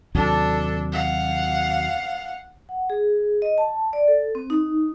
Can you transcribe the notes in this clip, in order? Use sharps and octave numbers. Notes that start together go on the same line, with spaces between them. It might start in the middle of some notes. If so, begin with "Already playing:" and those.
D#2 C3 F#3 D4 A4
F5 F#5
F#5
G#4
D#5
A5
D5
A4
C4
D#4